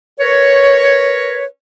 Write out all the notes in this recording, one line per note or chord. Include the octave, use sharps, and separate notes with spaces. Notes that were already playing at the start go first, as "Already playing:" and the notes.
A#4 B4 C#5